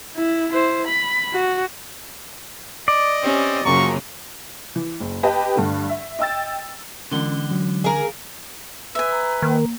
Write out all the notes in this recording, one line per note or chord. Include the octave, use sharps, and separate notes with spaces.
E4
E4 C5
B5
F#4
D5 D#5
C4 C#4 G4
F#2 C#3 F3 F#3 A#3 A#5 C#6
E3
F#1
G4 B4 D#5 A5
G2 D3 A3
E5
D#5 G5 E6 A6
D3 E3 G#3 C#4 C6
F#3
G#4 A#4 F5
B4 E5 G#5
A#5
D#3 A#3